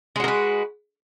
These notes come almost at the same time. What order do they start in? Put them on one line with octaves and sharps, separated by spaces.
G#3 F#4 A#4 B4